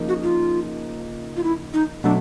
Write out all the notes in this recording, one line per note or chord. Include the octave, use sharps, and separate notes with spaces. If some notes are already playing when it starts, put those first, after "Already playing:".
Already playing: C#3 F3 A#3 D#4
F#4
F4
F4
E4
D#4
B2 F#3 A3 D4